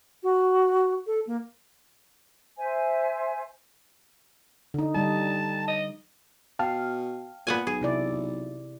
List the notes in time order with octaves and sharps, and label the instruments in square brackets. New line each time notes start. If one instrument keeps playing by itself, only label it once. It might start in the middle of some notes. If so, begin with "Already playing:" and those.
[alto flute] F#4
A4
A#3
[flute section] C5 E5 G#5
[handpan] D3 D#4
[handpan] D3 G3 D#4 [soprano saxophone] A5
[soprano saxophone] D#5
[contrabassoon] B2 [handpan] F5 [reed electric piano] G5 A5 F6
[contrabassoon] A#2 [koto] B3 F#5 G#5
[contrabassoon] B1 [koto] G#4
[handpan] C3 E4 D5